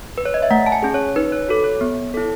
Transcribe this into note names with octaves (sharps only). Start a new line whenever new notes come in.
B4
C#5
D#5
E5
A3 F#5
A5
G#5
C#4 G#4
C#5
D#4 B4
C#5
F#4 A4
C#5
B3
E4 A4